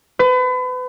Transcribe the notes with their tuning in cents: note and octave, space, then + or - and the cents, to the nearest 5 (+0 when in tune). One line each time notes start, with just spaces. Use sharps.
B4 +35